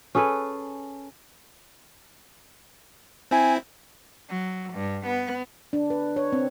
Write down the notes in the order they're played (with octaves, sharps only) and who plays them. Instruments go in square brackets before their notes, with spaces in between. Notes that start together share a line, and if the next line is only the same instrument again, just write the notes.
[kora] C#4 G#4 A4 B4
[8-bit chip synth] C4 E4 [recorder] G#5
[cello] F#3
G2
B3
[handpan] D4
B4
C#5
C4